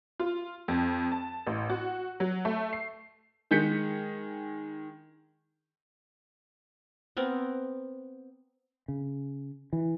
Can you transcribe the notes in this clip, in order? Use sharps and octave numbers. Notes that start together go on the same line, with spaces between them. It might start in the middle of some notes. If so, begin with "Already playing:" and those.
F4
F2
A5
A1
F#4
F#3
A3
C7
D#3 G#3 G#4 G6 B6 C#7
B3 C4 A#4
C#3
E3